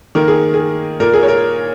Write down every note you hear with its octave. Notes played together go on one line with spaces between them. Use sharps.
D#3 A#3 A#4
G#4
G#4
A#2 A#3 A#4
G#4
C#5
A#4